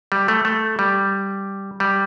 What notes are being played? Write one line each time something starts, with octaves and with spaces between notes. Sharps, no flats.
G3
A3
A3
G3
G3